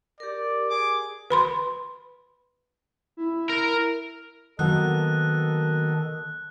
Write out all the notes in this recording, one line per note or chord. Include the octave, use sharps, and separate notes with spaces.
G4 A#4 D5
G#4 D6
B4 B5 C6
E4
A#4
D#3 F#3 A#3 B3 A4 D#5 F#6